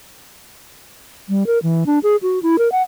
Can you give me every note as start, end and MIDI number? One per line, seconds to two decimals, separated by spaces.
1.29 1.47 55
1.47 1.59 70
1.63 1.84 52
1.86 1.99 62
2.03 2.16 68
2.22 2.42 66
2.43 2.56 64
2.59 2.71 70
2.72 2.82 78